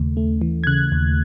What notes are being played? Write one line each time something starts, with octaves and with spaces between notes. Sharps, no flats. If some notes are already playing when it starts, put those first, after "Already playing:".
Already playing: D#2 C#3 A3
A3
E3
G#6
C#3 F#6
D#2